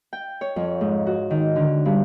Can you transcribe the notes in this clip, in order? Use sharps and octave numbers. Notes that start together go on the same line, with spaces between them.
G5
C#5
F2
G#2
F#4
D#3
D3
G2